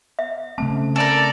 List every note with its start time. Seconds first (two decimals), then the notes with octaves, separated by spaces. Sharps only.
0.19 E5
0.58 C#3 A3 C4 A5
0.96 A4 A#4 D5